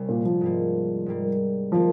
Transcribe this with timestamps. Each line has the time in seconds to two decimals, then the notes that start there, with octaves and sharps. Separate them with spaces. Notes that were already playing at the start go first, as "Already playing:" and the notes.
Already playing: C2 C3 G3 C#4
0.09 A#2
0.25 F3
0.41 G#2 G3 A#3
1.06 G#2 G3 A#3
1.72 D#3 F3 A#3 F4